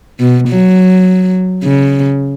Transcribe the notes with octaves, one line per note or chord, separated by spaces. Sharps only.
B2
F#3
C#3